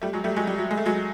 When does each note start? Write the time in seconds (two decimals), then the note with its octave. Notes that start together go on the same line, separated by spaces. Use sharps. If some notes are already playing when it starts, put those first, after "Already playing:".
0.02 G3 A3
0.13 F#3 G#3
0.24 G3 A3
0.36 F#3 G#3
0.47 G3
0.58 F#3
0.71 G#3
0.78 A3
0.86 F#3 G#3